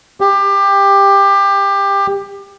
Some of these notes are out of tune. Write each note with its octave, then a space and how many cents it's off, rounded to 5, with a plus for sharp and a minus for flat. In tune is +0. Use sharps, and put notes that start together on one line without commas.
G4 +20